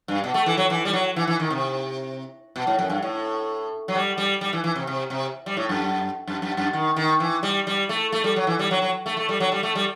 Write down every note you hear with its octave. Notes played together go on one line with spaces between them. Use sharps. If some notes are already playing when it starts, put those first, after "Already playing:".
G2
B2
A3
E3
F#3
E3
G3
F#3
E3
E3
D#3
C3
B2
A2
F#2
G2
A2
F#3
G3
G3
G3
E3
E3
C3
C3
C3
G3
A2
F#2
F#2
F#2
F#2
D#3
D#3
E3
G3
G3
A3
A3
G3
F#3
E3
G3
F#3
F#3
A3
A3
G3
F#3
G3
A3
G3